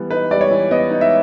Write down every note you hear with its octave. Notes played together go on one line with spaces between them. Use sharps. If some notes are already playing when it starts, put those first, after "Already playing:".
Already playing: E3 G3 B3
D#4 B4
G3 D5
C#5
E3
B3 D#5
D#4
E5